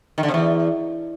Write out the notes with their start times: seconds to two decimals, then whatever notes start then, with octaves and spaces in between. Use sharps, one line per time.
0.18 D#3
0.23 D3
0.29 C3
0.34 E2